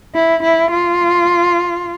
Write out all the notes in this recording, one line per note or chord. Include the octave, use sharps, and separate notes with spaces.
E4
E4
F4